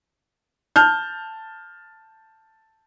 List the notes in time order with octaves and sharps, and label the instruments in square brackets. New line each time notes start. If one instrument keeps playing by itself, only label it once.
[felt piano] A5 F6 G6